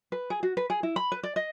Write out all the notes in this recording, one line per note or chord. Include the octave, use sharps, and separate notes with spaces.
B4
G#4
F#4
B4
G#4
E4
B5
B4
D5
D#5